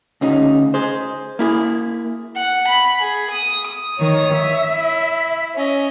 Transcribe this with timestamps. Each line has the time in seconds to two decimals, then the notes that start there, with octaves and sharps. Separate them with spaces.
0.21 D2 C#3 D#4
0.74 G#4 C5
1.39 A#3 E4 G#4
2.36 F#5
2.67 B5
3.00 G#4
3.30 D#6
3.98 D#3 C#5 D#6
4.34 E5
4.72 E4
5.55 C#4 D#5